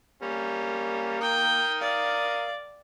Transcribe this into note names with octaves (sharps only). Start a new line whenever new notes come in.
G3 A#3 C#4
A#4 G5 D#6
D5 F5